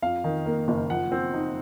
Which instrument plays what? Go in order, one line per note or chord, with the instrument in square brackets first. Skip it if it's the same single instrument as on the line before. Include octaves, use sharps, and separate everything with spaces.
[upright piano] F2 F5
D#3
A#3
F#1
F3 F#5
C4
D#4